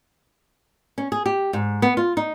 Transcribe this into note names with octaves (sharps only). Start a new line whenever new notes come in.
C#4
G#4
G4
G#2
B3
F4
D#4